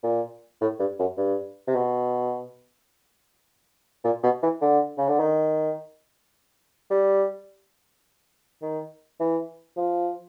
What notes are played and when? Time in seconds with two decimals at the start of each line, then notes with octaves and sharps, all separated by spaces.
0.03 A#2
0.61 A2
0.79 G2
0.99 F#2
1.17 G2
1.67 C3
1.75 B2
4.04 A#2
4.23 B2
4.43 E3
4.61 D3
4.98 C#3
5.09 D3
5.19 D#3
6.91 G3
8.62 D#3
9.20 E3
9.77 F3